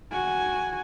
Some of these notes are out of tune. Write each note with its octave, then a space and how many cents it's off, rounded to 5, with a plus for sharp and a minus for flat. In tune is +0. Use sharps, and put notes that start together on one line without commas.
F#4 +0 G#5 +0